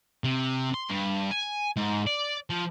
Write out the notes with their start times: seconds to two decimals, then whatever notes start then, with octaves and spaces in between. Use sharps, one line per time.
0.24 C3
0.74 C6
0.89 G2
1.31 G#5
1.76 G#2
2.07 D5
2.50 F3